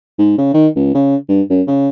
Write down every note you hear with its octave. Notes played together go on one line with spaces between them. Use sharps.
G#2
C#3
D#3
C#2
C#3
G2
F#2
C#3